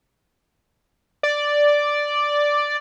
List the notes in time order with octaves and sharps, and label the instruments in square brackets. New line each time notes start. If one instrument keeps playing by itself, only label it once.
[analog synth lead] D5